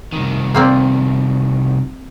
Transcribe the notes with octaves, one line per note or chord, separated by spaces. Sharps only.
C2 D#3
A#3 C4 D5